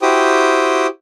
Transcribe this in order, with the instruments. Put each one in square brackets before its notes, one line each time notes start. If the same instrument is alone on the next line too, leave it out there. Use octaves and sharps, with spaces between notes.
[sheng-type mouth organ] E4 F#4 G4 C5 G5 D#6